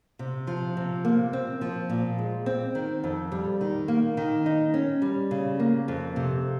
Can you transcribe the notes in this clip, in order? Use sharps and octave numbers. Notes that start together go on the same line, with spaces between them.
C3
F3
C3
A#3
C4
F3
A#2
G#3
C4
D#3
F2
G3
D#3
A#3
D#3
D#4
C#4
G3
C#3
A#3
F2
C3